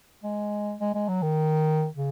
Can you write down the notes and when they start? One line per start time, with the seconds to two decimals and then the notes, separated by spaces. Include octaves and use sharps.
0.23 G#3
0.80 G#3
0.94 G#3
1.08 F#3
1.22 D#3
1.94 C#3